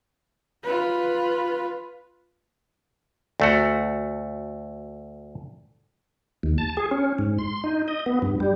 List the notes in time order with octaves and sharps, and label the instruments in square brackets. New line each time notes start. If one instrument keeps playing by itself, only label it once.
[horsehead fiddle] F4 B4
[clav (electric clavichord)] D2 A3 F#4
[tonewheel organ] D#2
A5
G#4
C#4
G#2
C6
D#4
D#5
B3
G2
G3